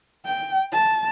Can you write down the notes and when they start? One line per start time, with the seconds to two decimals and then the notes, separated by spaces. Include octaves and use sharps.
0.25 G5
0.72 A5